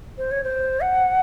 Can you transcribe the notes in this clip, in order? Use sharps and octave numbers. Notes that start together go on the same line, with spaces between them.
C5
C#5
C5
F#5